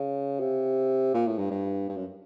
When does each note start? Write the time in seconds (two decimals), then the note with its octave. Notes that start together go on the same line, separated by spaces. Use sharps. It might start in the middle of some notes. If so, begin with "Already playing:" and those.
Already playing: C#3
0.40 C3
1.14 A#2
1.27 A2
1.38 G2
1.51 G2
1.89 G2
1.97 F#2